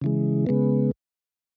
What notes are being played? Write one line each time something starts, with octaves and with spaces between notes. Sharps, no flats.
C#3 E3 G#3
C#3 G#3 B3